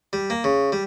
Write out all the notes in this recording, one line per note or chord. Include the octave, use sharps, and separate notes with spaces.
G3
A#3
C#3
G3